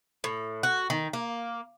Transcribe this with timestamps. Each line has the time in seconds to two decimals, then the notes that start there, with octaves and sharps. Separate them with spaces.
0.24 A2
0.63 F#4
0.90 D#3
1.13 A#3